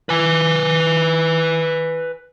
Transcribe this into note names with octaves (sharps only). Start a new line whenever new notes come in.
B4 G#5